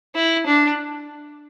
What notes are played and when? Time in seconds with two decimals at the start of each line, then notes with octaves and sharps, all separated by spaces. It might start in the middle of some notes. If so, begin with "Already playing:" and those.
0.15 E4
0.47 D4